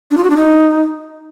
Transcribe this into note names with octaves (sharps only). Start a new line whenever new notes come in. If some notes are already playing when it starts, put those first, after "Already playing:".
D4
F4
F#4
D4
D#4